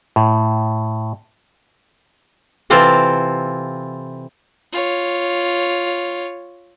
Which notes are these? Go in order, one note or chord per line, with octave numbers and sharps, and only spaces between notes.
A2
C3 E3 C4 F4 A4
F4 C#5